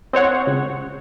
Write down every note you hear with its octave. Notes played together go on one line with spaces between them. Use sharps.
C4 C5 C#5 F#5
C#2